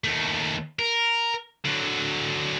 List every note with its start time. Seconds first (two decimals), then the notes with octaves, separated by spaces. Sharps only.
0.04 D#2 A3
0.79 A#4
1.65 D3 F#3